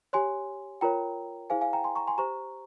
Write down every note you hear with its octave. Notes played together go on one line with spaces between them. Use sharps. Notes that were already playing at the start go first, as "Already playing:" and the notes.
G4 C#5 G#5 C6
F4 A#4 C#5 G5 A#5
E4 G#4 C5 F5 G#5
F5 G#5
G5 A#5
G#5 C6
A#5 C#6
G#5 C6
G4 C5 A#5 C#6